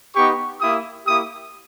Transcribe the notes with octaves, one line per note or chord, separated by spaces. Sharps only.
B3 D#4 G4 C#6
A#3 E4 G4 D#6
A#3 E4 G4 D#6